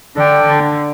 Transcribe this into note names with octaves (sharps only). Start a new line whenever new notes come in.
D3 D4 A4 D5 G5
D3